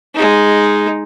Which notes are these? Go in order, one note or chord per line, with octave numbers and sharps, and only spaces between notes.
G#3 D#4